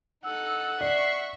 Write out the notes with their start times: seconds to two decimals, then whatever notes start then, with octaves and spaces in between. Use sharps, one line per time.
0.24 D#4 A4 F#5 E6
0.81 D5 E5 C#6 C7